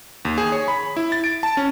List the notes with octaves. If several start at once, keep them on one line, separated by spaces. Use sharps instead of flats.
D#2
G#4
C#5
B5
E4
A6
D7
A5
C#4